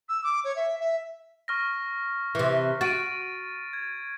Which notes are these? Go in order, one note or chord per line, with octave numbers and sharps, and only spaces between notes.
E6
D6
C#5
E5
E5
C#6 F6 A#6
C3 E3
F#4 A6 D7 D#7
G#6